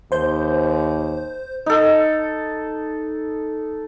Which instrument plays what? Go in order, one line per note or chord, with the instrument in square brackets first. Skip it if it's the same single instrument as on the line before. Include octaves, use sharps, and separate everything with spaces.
[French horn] D#2 [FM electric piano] C5 G6
[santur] D#4 A4